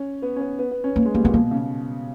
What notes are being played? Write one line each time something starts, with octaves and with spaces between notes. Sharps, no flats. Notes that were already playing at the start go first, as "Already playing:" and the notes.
Already playing: C#4
B3
C#4
B3
B3
B3
C#4
A#3
G#3
G3 A#3
A#2 B3
B2 A#3
C#3